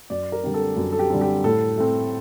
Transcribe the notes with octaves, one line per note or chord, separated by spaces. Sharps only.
F#2 D5
A#4
D3 G3 C4
A4
F#2
A4
G4
D3 G3 C4
G4
A2 A4
A3 C4